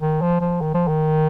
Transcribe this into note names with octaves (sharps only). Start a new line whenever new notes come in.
D#3
F3
F3
D#3
F3
D#3